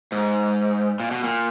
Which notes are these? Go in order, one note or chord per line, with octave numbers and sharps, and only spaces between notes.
G#2
A#2
B2
A#2